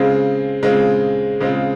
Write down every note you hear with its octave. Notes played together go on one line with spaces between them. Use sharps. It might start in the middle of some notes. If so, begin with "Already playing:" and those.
Already playing: C#3 G#3 C4 F4
C#3 G#3 C4 F4
C#3 G#3 C4 F4